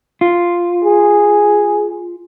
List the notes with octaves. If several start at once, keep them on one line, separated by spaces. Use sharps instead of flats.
F4
G#4